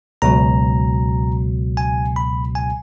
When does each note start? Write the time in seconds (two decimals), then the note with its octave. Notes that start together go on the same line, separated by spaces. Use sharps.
0.22 C#2 B2 F#3 A#5
1.77 G#5
2.16 B5
2.55 G#5